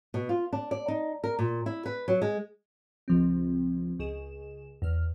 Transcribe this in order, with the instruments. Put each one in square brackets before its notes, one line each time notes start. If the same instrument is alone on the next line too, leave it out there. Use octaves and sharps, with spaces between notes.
[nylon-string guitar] B2
F4
D4
D5
D#4
A#4
A#2
E4
B4
F#3
G#3
[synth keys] C#2 F3 C4
C#2 G#4 E7
E2 F6